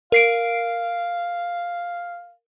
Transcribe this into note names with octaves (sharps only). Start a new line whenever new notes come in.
A#4 F5 C7 D7